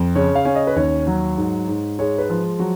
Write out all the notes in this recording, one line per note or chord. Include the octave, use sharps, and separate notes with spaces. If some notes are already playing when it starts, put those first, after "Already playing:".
Already playing: F2
C#3 C#5
F5
C#4
D#5
B4
D#2 C#5
F#3
G#2
G#2
G#3 C#5
B4
F3
F#3 F#4